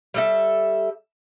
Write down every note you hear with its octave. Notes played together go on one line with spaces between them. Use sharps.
G3 A4 E5